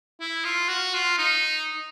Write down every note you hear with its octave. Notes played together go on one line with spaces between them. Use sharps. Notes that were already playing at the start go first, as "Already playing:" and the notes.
E4
F4
F#4
F4
D#4